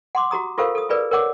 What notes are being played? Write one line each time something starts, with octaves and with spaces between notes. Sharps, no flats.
F#5 C6 D6
F#4 G4 A#5 D#6
F4 G4 A4 A#4 C5 F5
A4 D#6
F4 G#4 A#4 B4 D5
A#4 C#5 F#5 D6